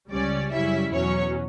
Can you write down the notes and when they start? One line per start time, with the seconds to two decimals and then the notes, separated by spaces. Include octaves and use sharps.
0.11 C#2 C#3 G3 C#4 D5
0.52 F#2 C#3 G3 C#4 E4 E5
0.93 E2 B2 F#3 C#4 C#5